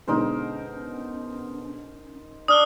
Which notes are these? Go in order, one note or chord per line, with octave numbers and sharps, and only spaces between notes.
B2 D3 G#3 C#4 D#4 A#4 C5
D4 D#6 F6 G7